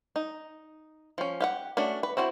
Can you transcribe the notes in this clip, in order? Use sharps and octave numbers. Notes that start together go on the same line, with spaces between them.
D#4
F3 C#4
G4 F5 F#5
A3 C#4 D4 F#4
B4
C4 E4 F#4 C5